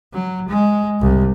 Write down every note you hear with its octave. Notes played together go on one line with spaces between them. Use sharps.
F#3
G#3
C2